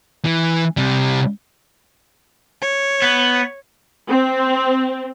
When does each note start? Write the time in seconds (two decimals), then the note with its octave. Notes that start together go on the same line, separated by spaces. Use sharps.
0.25 E3
0.77 C3 G3
2.62 C#5
3.02 B3
4.09 C4